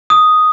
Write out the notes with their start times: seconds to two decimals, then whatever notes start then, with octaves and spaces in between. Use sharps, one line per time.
0.10 D#6